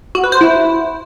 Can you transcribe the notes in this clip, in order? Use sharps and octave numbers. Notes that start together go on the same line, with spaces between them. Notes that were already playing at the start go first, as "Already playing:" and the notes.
F#4
B4
C5
E4